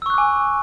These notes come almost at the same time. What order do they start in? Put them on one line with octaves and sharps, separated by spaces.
E6 C#6 F#6 D6 G#5